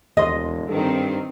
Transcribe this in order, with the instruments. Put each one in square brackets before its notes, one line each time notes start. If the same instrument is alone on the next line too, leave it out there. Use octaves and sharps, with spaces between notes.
[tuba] E1 [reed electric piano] D#2 C6 [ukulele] D#5
[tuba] G2 [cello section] D#3 C4 [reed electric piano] A4